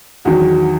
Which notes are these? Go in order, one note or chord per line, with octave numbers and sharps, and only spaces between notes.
E2 D#3 F#3 F#4